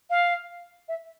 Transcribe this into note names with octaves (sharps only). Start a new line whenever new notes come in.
F5
E5